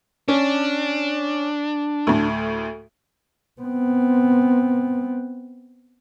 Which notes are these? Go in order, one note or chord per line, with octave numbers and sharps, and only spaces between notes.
C#4 D4
D2 A2
B3 C4